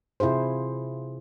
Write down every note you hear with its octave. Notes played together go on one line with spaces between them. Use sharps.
C3 E4 F4 G#4 C5